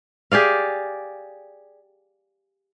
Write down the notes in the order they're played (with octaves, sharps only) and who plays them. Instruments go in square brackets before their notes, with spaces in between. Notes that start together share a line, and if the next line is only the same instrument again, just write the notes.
[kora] G4 G#4 D5 F5